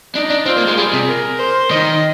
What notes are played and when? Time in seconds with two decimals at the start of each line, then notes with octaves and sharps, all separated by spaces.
0.15 D4 D#4
0.30 D4
0.46 C4 F4
0.57 A#3
0.67 G#3
0.77 G3 G#4
0.93 C3
1.09 A#4
1.39 C5
1.70 D#3 D#5